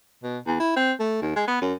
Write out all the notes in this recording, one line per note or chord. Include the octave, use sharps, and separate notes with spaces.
B2
E2
E4
C4
A3
D#2
G#3
B3
F#2